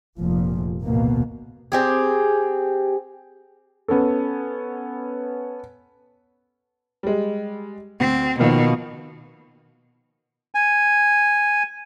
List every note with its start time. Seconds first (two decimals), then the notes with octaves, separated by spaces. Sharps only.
0.19 F1 A#2 F3
0.83 A1 D2 B2 A#3
1.72 C4 G4 G#4
3.88 B3 C#4 A4
7.03 G3 G#3
8.00 D2 C4
8.40 B2 D#3 F3 A#3
10.55 G#5